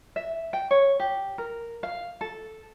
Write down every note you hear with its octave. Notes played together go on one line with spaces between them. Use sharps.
E5
G5
C#5
G4
A#4
F5
A4